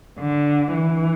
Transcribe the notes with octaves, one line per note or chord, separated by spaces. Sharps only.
D3
E3